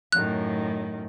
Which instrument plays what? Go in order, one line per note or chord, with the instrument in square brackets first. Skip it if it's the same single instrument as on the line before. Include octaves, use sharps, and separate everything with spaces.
[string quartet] F#2 A2 D#3 [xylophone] F#6